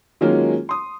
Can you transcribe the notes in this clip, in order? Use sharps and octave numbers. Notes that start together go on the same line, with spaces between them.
D#3 F#3 G#3 A#3 C#4 F4
C6 D#6